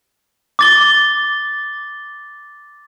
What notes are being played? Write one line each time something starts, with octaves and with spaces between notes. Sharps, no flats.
D6 A6 G7